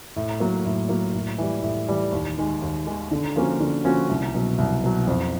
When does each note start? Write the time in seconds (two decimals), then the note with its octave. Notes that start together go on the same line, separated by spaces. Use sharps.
0.16 A2
0.40 F#3 A#3
0.65 A2
0.89 F#3 A#3
1.14 A2
1.38 E3 G3
1.63 A2
1.89 E3 G3
2.12 D#2
2.38 D#3 G#3
2.62 D#2
2.87 D#3 G#3
3.11 D3
3.36 F3 A#3 C#4 F#4
3.61 D3
3.85 F3 A#3 C#4 F#4
4.09 C2
4.34 B2 F#3
4.58 C2
4.84 B2 F#3
5.07 F2